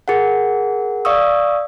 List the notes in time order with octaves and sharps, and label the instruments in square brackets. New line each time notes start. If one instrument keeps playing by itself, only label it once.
[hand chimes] G#4 A#4 F#5
D5 F5 C#6 D#6 E6